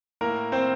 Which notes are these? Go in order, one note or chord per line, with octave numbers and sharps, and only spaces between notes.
A2 A#3 A#4
C4 C5